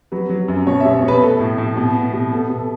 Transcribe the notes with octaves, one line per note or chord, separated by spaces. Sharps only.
F#3 B4
F#3
F#2
B2 C#5
B2 E5
C#5
B2
B4
A3 A4
A2
A2
B2
B3
B2
B3 A4
B2
A4